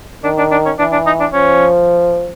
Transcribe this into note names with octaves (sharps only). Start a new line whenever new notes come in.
D#3 D4
D4
D4
C#4
E3 D4
D4
D#4
D4
F3 C#4